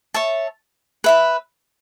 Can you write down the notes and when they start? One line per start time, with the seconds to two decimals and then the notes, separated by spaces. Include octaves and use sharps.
0.14 C#5 E5 A5
1.04 B4 E5 B5